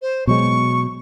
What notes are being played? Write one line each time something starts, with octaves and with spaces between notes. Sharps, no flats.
C5
B2 F#3 G#3 C#6